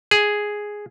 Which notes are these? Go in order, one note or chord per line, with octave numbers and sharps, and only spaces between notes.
G#4